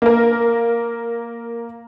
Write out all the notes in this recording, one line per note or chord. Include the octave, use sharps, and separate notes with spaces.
A#3 A#4